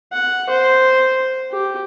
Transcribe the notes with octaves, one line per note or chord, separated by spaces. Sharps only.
F#5
C5
G4